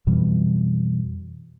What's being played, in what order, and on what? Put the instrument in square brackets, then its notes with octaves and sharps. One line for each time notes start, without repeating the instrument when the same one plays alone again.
[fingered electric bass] F2 B2 E3 G3